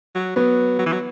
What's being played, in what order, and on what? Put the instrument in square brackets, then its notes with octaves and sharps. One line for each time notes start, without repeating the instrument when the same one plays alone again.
[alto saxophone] F#3
[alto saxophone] F#3 [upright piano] B3
[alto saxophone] F#3
E3
F#3